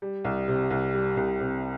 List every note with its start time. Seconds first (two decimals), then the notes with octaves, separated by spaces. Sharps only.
0.02 G3
0.24 C2
0.48 C3
0.70 C2
0.94 G3
1.17 C2
1.40 C3